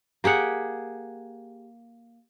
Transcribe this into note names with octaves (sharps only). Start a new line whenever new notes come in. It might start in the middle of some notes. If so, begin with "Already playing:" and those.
A#3 G4 G#4 F#5